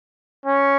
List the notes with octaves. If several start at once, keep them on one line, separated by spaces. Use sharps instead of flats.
C#4